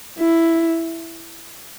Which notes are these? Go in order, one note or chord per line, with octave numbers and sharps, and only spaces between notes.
E4